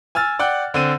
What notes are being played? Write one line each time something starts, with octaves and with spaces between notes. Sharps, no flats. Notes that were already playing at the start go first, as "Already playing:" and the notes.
G#5 E6 F6 A6
D5 F#5 G5 F#6
D3 C4 D#7